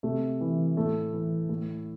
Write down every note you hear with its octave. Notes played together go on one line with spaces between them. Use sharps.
C3 A3
E3
A2 A3
E3
A2